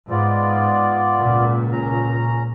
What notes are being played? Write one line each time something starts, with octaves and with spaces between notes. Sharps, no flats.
G#2 B3 F4 D5
C#2 A#2
C#4 A#5